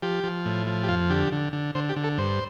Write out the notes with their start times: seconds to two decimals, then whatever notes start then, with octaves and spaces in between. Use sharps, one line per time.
0.02 F3 G4
0.24 F3
0.45 A2
0.67 F3
0.83 G4
0.88 F2 F4
1.10 D3 G4
1.32 D3
1.53 D3
1.75 D3 C5
1.89 G4
1.96 D3
2.04 A4
2.18 G2 C5